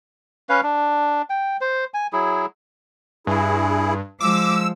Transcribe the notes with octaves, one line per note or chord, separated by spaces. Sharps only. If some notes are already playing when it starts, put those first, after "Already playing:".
C#4 B4 F5
D4
G5
C5
G#5
F#3 E4 G#4
G2 E4 G#4
F3 G#3 D6 E6